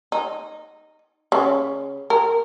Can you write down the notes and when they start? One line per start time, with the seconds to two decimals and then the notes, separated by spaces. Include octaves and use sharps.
0.12 D#4
1.32 C#3
2.10 A#4